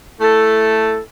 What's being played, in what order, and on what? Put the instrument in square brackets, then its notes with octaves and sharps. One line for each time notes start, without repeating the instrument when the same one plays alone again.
[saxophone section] A3 E4 A4